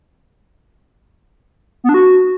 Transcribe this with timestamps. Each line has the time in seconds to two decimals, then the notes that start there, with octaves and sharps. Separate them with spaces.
1.84 B3
1.89 D4
1.94 F#4